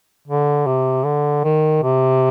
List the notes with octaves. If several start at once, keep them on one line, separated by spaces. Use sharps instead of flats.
D3
C3
D3
D#3
C3